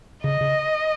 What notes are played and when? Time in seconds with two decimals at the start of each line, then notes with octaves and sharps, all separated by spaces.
0.23 C#3 D#5
0.41 C#3